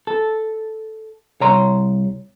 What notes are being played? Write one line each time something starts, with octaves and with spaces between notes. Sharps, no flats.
A4
C2 C#5 A#5 C6